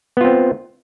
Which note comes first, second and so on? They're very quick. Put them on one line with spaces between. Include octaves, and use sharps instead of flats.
B3 F4 C4